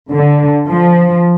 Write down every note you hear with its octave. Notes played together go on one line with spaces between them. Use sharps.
D3
F3